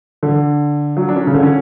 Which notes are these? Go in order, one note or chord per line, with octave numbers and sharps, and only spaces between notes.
D3
F#3
D4
C#4
C#3
D3
C#4